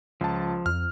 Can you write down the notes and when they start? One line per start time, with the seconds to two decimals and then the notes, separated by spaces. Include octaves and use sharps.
0.21 C#2 F3 A5
0.66 F2 F6